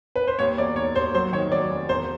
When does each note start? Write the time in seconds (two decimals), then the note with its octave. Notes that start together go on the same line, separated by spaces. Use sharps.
0.16 B4
0.27 C5
0.39 D#2 C#5
0.58 E1 D5
0.76 E1 C#5
0.95 D#2 C5
1.15 F#3 C5
1.33 D#3 C#5
1.52 F#3 D5
1.70 F1
1.89 E1 C5